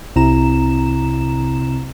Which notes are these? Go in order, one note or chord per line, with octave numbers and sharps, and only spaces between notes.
C2 C3 C4 E4 A#5 E7